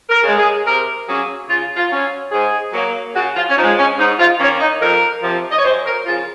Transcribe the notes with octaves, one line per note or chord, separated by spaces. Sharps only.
A#4
C#3 G#3
G#4
C3 A#4
F#3 A#3 C#4 G#4
C#3 F4
F4
F#3 C#4
G#2 G#4
F#3 A#3
C#3 F#4
F4
C#4
F3 G#3 D#4
C#4
G#2 D#4
F4
D#3 A#3 C#4
D#4
F2 A#4
C3 F3
D#5
C#5
F#2 C5
A#4
C#3 F3 F4